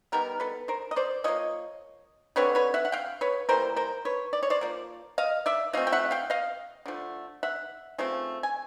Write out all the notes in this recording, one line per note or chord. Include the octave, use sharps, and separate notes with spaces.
D#3 G3 B3 A#4
A4 B4
A#4 C5
D#5
C5 D5
F3 A#3 C#5 D#5
D3 G3 C4 B4 C#5
B4 C#5
E5 F#5
F#5
F5 G5
B4 C#5
E3 G3 A#3 A#4 C5
A#4 C5
B4 C#5
D5
C#5
C5 D5
F3 A#3
D#5 F5
D5 E5
F3 A3 C4 D#5 F5
G5
E5 F#5
F5 G5
D#5 F5
D3 F3 A3
E5 F#5
C#3 F3 A3 C4
G#5